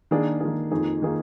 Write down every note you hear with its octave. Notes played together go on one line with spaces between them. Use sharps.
D#3 A#3 D4 G#4
D#3 A#3 D4 G#4
F2 D#3 A#3 D#4 G#4
D#3 A#3 D#4 G#4